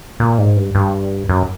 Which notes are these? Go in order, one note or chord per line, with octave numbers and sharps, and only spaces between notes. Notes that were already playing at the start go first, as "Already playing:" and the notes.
A#2
G#2
G2
G2
F#2